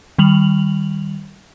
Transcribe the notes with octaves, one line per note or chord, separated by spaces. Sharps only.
D#3 G3 F7 F#7